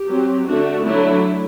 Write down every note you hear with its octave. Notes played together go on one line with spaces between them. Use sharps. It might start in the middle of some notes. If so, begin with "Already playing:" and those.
Already playing: G4
F#3 C4
D3 A3 D4 F#4
D3 F#3 A3 D4 E4